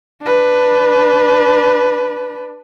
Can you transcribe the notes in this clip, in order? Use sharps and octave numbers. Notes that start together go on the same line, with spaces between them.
D4 B4